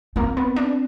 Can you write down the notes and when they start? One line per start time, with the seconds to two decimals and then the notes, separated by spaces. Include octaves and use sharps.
0.16 A#3 C4
0.37 B3
0.56 D4